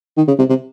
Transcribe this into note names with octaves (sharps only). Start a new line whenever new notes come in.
D#3
C#3
C3
C3